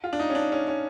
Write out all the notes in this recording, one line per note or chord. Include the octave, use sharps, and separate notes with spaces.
F4
D4
D#4
C#4
D4
C#4
C#4